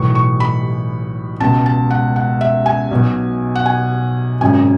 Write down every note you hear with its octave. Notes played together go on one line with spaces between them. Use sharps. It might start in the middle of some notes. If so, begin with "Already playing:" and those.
Already playing: B1 A2 E3 C#6
C#6
B5
C#2 B2 A5
A5
F#5
F#5
E5
G#5
B1 B2
F#5
G#5
G#1 F#2 C#3 G#5